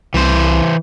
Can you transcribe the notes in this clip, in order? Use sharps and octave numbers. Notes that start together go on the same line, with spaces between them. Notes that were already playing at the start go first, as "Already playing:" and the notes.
C2 E3 C5